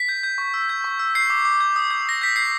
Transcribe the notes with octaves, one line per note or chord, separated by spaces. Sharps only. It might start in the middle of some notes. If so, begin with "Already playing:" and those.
Already playing: B6
G6
G6
C#6
E6
G6
C#6
E6
G6 C7
D6
D6
G6
D#6
G6
D#6 A#6
G6 B6
G6 C7